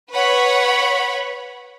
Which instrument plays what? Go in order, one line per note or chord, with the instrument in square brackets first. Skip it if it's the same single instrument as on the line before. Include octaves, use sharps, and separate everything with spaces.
[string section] B4 C#5 F#5 B5 C#6